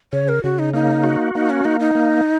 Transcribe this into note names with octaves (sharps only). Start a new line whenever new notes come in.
C#3 C#5
A#4
C#3 F#4
D#4
A#3 D#4
F#4
A#3 D#4
C#4
A#3 D#4
D#4
A#3